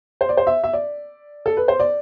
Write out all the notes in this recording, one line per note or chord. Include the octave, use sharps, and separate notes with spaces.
C5
D5
C5
E5
E5
D5
A4
B4
C5
D5